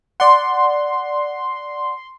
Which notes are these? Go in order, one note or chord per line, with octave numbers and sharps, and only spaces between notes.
D5 F#5 C6